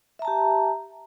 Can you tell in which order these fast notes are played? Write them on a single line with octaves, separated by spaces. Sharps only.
E5 A#5 A5 G4